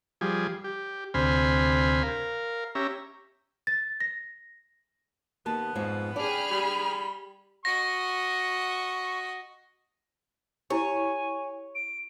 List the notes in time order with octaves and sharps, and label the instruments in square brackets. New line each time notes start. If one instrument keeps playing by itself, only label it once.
[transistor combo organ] F3 G3 G#4
G4
D2 C3 C5 G#5 B5 F6
A#4 F5
C#4 G4 E5 A#5
[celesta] A6
A#6
[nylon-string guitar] D#2 D#3 A5 [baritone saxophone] B3
[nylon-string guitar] F2 G#2 F3
[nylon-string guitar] D4 D5 [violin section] G4 G#4 F6 [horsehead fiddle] B5
[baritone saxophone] G3
[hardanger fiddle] F#4 D#5 [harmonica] C#6 [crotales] A#6
[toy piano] E4 G4 [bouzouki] C#5 [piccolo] G#5
[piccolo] D7